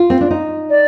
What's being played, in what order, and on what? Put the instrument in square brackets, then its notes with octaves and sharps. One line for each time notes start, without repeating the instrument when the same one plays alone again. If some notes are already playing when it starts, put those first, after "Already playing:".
Already playing: [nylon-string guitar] F4
C4
D4
D#4
[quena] D5